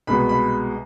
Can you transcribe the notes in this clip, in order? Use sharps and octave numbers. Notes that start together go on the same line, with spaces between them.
C2 B2 G#3 B3 B5
B5